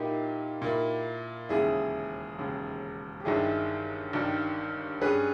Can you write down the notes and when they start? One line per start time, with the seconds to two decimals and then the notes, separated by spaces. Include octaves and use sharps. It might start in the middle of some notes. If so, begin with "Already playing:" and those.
Already playing: A#2 A#3 D#4 E4 G4
0.62 A#2 A#3 E4
1.49 E1 D#2 C#3 E4 G#4
2.38 E1 D#2 C#3
3.20 G4
3.25 G1 G2 D#3 G3 E4 G#4
4.13 G1 G2 D#3 G3
5.01 G2 G3 C#4 G#4 B4